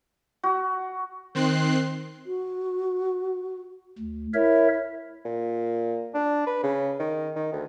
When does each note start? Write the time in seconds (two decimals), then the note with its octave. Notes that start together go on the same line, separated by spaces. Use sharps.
0.43 F#4
1.35 D#3 C4 C6 F#6 C7
2.26 F#4
3.99 D2
4.34 E4 A#4 C#5 E5
5.25 A#2
6.14 D4
6.46 B4
6.63 C#3
6.99 D#3
7.36 D#3
7.52 D2